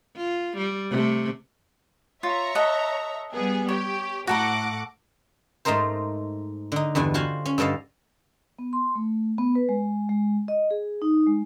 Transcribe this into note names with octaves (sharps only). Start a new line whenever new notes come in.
F4
G3
C3 A3
F4 C#5 E5 A#5
A4 D#5 F#5
G3 B3 G#4
G4 C#5
A2 F#4 A4 F#5 A#5 D6
G#2 A3 D#4 A#4 C5
D3 D#4
E2 G2 D3 G#5
F4 F#4 C5 F5 G#5
C#4
G2 D3 A4 D#5 F5
B3
C6
A3
B3
B4
G#3
G#3
D#5
G#4
D#4
G#3